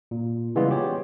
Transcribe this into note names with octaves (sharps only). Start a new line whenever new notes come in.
A#2
C#3 E3 G3 G#3 B3 F4
G4 C#5